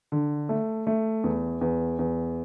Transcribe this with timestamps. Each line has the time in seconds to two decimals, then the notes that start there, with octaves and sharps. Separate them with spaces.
0.12 D3
0.49 A3
0.87 A3
1.24 E2
1.61 E2
1.99 E2